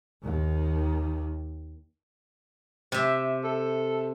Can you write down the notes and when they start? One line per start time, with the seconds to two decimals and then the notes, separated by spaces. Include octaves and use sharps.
0.24 D#2 D#3
2.92 C3 E5
3.44 A4